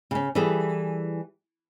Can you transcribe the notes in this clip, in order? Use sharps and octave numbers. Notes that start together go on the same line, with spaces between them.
C#3 C#4
E3 G3 G#4 A4